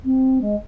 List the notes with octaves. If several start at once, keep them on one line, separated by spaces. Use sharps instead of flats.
C4
G#3